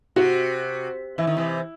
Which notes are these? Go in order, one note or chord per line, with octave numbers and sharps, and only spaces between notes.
C3 F#4
E3 E4
D#3
C3 E3